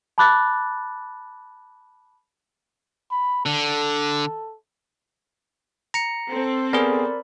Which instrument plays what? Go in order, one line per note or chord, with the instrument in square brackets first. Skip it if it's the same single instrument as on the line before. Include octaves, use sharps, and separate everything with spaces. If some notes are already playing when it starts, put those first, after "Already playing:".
[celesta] A5 B5 D6 F#6 A6
[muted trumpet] B5
[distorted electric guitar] D3 [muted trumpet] A4
[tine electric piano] A#5 C#7
[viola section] C4 A4
[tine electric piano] B3 G#4 [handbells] A#4 D5 B5